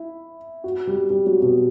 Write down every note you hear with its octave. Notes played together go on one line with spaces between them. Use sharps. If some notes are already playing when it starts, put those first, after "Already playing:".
Already playing: E4
F#4
G3
G3
F#3
B2